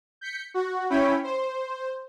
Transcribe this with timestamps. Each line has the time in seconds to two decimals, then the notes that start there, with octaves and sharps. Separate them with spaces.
0.21 G6 B6 C#7
0.54 F#4
0.90 C#4 E4 C#5 G5 B5
1.24 C5